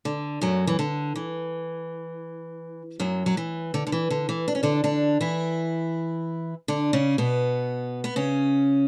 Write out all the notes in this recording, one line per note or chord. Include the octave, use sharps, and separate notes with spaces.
D3
F#2 F#3
E3
D3
E3
F#2 F#3
F#3
E3
D3
D3
E3
D3
E3
D4
C#4
D3 D4
D3 D4
E3 E4
D3 D4
C#3 C#4
B2 B3
B3
C#3 C#4